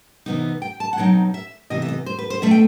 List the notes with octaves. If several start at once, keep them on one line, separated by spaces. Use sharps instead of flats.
C3 E3 B3 D#4
G5
A5
F#5
B2 F#3 C4 D#4 G5
E5
C3 E3 B3 D#5
E5
D#5
C5
B4
C5
B2 A3 C4 E5
G5